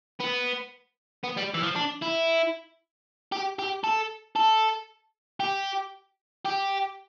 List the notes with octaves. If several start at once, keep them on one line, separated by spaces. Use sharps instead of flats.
B3
B3
G3
E3
F3
D4
E4
G4
G4
A4
A4
G4
G4